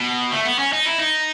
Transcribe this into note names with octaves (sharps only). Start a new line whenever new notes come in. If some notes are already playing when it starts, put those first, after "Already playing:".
Already playing: B2
A3
B3
C#4
D#4
E4
D#4